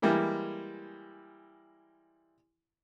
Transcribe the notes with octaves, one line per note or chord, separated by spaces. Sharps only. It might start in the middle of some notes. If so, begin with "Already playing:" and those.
E3 G3 G#3 A#3 E4